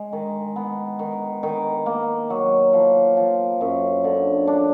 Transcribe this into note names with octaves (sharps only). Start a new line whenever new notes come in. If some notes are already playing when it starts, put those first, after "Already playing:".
Already playing: G#3
D#3
B3
D#3
D#3
A#3
F#3
F3
F3
F#2
D3
D4